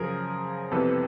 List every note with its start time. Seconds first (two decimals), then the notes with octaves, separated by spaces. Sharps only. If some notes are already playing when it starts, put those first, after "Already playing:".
Already playing: F#2 C#3 F3 G#4 A#4
0.71 F2 C3 E3 G3 B3 A4 B4